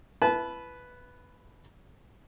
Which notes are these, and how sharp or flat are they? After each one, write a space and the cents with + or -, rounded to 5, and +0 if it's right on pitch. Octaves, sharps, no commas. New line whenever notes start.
E4 +30 B4 +0 A5 -30